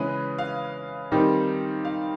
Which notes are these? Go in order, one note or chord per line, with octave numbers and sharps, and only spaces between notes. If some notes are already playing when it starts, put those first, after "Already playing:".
Already playing: C#3 E3 G#3 C#4 B4
F5
D#3 G3 C4 D#4
F5